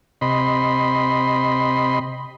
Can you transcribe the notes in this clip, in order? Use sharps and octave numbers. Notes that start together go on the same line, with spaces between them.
C3 D#5 B5 C6